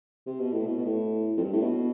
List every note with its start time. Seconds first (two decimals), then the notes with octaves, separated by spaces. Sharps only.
0.27 C3
0.39 B2
0.52 A2
0.66 B2
0.78 B2
0.85 A2
1.37 F2
1.43 G2
1.53 A2
1.62 B2